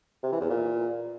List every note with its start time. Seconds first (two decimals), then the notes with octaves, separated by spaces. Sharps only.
0.23 C3
0.32 E3
0.41 E2
0.50 A#2